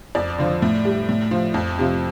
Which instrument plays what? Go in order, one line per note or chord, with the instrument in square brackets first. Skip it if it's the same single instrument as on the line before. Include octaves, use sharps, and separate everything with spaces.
[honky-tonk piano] F2 D5
D3 F3
A2
G3
A2
F3
F2
C3 F3